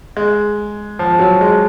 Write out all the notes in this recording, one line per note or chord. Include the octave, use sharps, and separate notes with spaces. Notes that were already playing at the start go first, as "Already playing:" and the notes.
G#3
F3
F#3
G#3